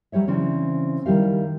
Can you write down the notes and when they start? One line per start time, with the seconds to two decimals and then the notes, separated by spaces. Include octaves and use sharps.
0.12 F#3 G3 G4 C#5 E5
0.28 C#3 E3 C4 D4
1.06 D#3 G3 E4 G4 F5